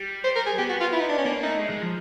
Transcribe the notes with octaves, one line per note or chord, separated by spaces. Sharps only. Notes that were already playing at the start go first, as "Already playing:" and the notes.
Already playing: G3
C5
A#4
G#4
B3 G4
F#4
F4
E4
D#4
D4
C#4
A#3 D4
A3 D#4
G#3
G#3
F3